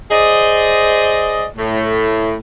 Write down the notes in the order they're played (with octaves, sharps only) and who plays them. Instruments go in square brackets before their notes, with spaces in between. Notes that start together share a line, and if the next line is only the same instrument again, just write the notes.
[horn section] G#4 C5 D5 D#5
A2